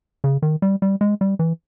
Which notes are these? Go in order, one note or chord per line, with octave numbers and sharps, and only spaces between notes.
C#3
D#3
G3
G3
G#3
G3
E3